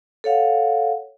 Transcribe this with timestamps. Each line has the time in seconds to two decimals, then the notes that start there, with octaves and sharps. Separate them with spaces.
0.24 A4 C#5 F5 F#5